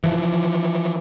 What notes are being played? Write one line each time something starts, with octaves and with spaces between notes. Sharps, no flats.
E3 F3